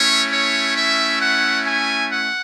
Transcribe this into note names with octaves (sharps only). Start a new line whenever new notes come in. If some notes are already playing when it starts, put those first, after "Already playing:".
Already playing: A3 C#4 E4 C#5
C#5
E5
F#5
G#5
F#5